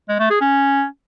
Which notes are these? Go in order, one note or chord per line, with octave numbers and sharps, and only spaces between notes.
G#3
A3
G#4
C#4